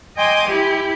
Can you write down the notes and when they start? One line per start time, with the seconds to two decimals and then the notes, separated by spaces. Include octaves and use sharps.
0.16 D#5 G5 G#5 C6 D6 D#6
0.47 E4 G4